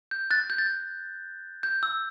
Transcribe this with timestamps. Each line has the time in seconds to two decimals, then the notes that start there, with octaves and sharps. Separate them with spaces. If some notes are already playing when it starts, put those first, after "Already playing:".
0.11 G6
0.31 F#6 A6
0.50 G6
0.58 A6
0.66 G6
1.63 G6
1.83 E6